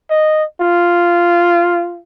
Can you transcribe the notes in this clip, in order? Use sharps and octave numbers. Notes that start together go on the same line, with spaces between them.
D#5
F4